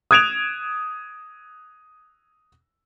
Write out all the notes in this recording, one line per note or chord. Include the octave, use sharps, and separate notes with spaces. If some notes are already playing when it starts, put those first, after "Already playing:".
D#6 F#6 G#6 D7 E7 F7